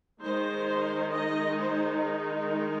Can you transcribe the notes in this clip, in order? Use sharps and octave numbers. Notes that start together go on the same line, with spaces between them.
D#3 G#3 D#4 C5
D#5
C5
A#4